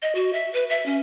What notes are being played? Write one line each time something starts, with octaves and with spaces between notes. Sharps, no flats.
D#5
F#4
E5
B4
E5
C#4